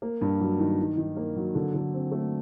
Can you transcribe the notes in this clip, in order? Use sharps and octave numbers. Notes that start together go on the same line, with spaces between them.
A#3
G2
F#3
D#3
D#3
D#3
A#3
F#3
D3
D3
C4
A3